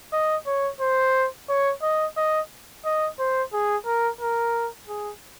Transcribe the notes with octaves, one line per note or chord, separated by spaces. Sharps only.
D#5
C#5
C5
C#5
D#5
D#5
D#5
C5
G#4
A#4
A#4
G#4